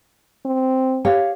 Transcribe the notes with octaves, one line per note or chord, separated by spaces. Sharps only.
C4
G4 C#5 F5